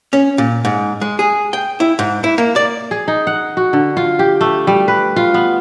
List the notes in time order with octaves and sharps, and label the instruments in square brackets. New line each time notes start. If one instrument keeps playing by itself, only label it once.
[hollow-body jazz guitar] C#4
A#2
G#2
G#3
G#4
G5
E4
G#2
E4
A#3
D5
[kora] G#4
D#4
F#5
F#4
D3
F4
G4
A3
G3
B4
F4
B3